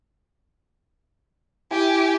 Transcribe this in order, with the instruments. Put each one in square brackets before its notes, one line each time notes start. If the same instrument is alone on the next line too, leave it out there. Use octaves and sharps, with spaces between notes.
[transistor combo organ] E4 G#5 [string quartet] G4